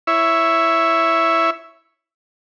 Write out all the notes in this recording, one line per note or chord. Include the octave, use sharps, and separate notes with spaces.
E4 C#5 E5